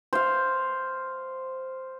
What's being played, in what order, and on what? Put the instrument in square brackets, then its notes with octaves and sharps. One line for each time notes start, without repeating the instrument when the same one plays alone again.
[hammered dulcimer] C5 F5